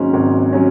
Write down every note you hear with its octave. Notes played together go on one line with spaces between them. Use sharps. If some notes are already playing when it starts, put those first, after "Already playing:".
Already playing: G#1 G#2 F#3 C#4
G#1
F#3 C#4